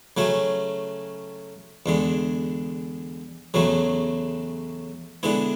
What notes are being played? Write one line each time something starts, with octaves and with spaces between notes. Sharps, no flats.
C#3 F#3 A3 C#4
E2 D3 G#3
E2 C#3 F#3 A3
D3 G#3 B3 E4